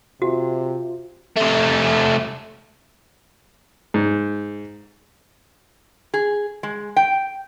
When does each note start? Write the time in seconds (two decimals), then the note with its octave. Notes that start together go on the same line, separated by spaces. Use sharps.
0.22 C3 F4 F#4
1.37 C3 A3
3.94 G#2
6.14 G#4
6.63 G#3
6.96 G5